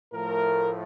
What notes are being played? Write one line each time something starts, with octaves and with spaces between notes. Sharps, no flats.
A2 F3 A3 A#4